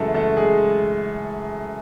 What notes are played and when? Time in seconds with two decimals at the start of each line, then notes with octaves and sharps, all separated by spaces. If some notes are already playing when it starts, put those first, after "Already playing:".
Already playing: F#2 C#3 E3 G#3 A3 G#4 A4
0.14 A3 A4
0.37 G#3 G#4